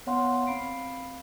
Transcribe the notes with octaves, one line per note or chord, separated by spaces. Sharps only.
B3 C#5 F5 F#5 C6
C4 F5 B5 C7 D7